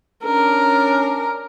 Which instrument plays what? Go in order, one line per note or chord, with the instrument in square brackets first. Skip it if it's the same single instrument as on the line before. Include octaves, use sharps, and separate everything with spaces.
[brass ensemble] C#4 D4 [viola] A#4